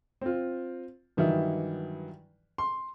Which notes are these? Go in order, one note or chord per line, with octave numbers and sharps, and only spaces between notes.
C4 F4
G2 D#3 E3 F#3 E4
C6